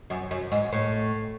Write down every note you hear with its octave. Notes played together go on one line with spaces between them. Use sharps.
F#2
F#2
G#2
A2